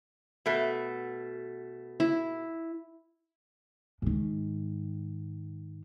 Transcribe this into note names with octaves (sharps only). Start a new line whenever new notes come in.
B2 A3
E4
G#2 D#3